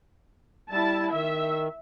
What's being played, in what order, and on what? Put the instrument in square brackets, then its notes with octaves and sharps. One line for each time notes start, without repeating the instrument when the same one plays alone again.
[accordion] G3 [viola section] E4 A5
[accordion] D#3 [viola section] E5